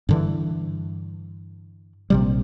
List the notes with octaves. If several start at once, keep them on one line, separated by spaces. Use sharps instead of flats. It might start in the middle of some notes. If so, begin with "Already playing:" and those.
G2 D3 E3
A#1 C3 G3